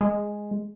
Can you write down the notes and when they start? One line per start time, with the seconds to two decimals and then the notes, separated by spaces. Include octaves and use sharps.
0.01 G#3